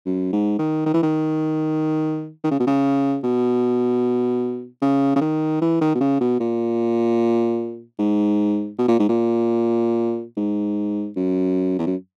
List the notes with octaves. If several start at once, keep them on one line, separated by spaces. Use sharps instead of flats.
F#2
G#2
D#3
D#3
E3
D#3
D#3
C#3
B2
C#3
B2
C#3
C#3
D#3
E3
D#3
B2
C#3
B2
A#2
G#2
B2
A#2
G#2
A#2
G#2
F#2
E2
F#2